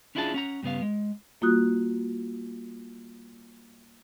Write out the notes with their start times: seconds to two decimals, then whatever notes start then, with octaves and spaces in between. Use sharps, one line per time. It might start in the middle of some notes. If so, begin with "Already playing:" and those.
0.15 C#4 D4 E4 F4 G#4 A5
0.34 C#4 F#5 A#5
0.63 G2 C#3 B3 F5
0.82 G#3
1.41 G3 A#3 F4 F#4 D#6 F#6